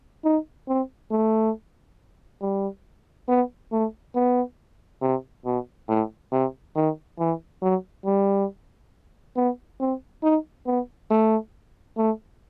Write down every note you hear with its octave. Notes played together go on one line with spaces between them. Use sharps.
D#4
C4
A3
G3
B3
A3
B3
C3
B2
A2
C3
D#3
E3
F#3
G3
B3
C4
D#4
B3
A3
A3